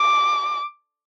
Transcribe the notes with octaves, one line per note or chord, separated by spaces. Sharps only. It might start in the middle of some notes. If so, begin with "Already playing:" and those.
Already playing: D6